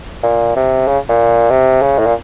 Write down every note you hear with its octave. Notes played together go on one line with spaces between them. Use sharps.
A#2
C3
C#3
A#2
C3
C#3
A2
A#2